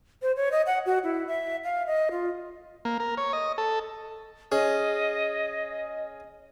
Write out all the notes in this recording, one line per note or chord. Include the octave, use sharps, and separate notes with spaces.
C5
C#5
D#5
F#5
F#4
E4
E5
F5
D#5
F4
A#3
A#4
C#5
D#5
A4
C#4 G#4 D#5